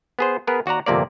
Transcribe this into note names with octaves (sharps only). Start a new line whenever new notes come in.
B3 G#4 C5
B3 G#4 A#4 B4
D#2 F#4 D5 F#5 A#5
G1 F2 C3 A#3 D5